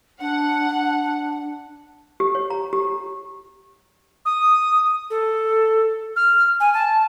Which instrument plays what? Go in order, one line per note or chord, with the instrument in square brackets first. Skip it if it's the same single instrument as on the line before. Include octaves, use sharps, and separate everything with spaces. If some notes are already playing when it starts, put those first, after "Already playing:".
[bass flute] D4 [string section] F#5
[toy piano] G4
C#5
A#5
G4
[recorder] D#6
A4
F6
G#5
A5